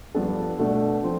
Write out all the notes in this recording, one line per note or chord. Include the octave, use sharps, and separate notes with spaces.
G2 F3 B3 D4 A4
B2 A3 D4
F3 C4